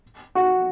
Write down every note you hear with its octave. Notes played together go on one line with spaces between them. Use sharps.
F#4